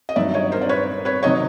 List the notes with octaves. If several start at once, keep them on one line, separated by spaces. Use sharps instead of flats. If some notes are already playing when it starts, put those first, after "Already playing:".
D#5
G2 D#3 F#3 D5 E5
C#5 D#5
A#4 C5
D5
B4 C#5
B4 C#5
C3 D#3 F#3 C#5 D#5